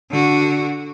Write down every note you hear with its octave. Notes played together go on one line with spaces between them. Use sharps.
D3 F#4